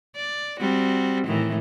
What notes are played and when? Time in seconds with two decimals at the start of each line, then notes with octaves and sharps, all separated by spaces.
0.16 D5
0.60 G3 C4 F#4
1.27 A2 D#3 E3